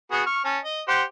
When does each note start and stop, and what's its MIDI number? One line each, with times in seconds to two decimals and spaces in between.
0.11 0.22 59
0.11 0.22 66
0.11 0.22 68
0.26 0.44 85
0.26 0.44 89
0.45 0.59 61
0.45 0.59 81
0.64 0.82 75
0.88 1.03 67
0.88 1.03 72
0.88 1.03 78